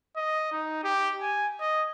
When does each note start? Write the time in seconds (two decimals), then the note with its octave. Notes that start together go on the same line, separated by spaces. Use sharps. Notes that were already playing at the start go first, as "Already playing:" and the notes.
0.16 D#5
0.52 D#4
0.84 G4
1.22 G#5
1.60 D#5